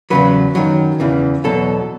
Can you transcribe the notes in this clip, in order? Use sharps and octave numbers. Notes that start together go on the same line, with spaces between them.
E2 C#3 F#3 B4
F#2 D#3 F#3
E2 C#3 E3
E2 B2 F#3 A4